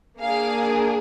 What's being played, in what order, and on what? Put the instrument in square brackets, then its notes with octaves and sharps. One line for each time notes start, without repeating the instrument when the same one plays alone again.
[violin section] A#3 D4 G#4 F5